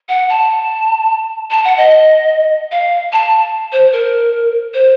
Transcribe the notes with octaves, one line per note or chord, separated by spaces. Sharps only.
F#5
A5
A5
F#5
D#5
F5
A5
C5
A#4
C5